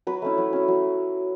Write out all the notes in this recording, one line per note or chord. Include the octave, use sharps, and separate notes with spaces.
F#3 B4
A3 C#4 E4
F#3
C#4 E4
F#3